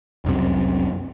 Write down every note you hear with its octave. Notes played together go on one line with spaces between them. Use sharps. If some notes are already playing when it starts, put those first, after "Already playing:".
F1 C2 F#2 C3